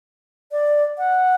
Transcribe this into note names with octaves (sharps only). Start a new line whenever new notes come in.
D5
F#5